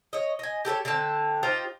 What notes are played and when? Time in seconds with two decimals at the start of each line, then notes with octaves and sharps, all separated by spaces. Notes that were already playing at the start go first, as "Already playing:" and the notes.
0.13 C#5 D#5
0.39 D#5 G#5
0.65 G4 A4 A#4 C#5
0.85 D3 C4 G5 A5
1.43 D#4 F4 G4 C5